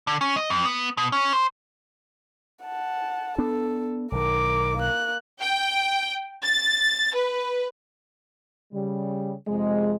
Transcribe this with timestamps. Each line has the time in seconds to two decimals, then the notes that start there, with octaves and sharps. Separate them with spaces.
0.07 D3
0.21 C#4
0.36 D#5
0.50 F2
0.65 B3
0.97 B2
1.12 C#4
1.33 C5
2.64 F#5 A5
3.38 B3 D4 A4
4.12 B1 D#3 A#4 D6
4.77 A#3 F#6
5.39 G5
6.43 A6
7.14 B4
8.72 C#3 G3
9.47 F2 C3 G#3